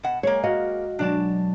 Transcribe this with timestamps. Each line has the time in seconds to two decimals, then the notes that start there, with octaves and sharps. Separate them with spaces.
0.03 B2 F#5 E7
0.23 G#3 A#3 G#4 C#5
0.43 F#4 D#5 F5
0.99 B2 F#3 G#3 D4 D5 A5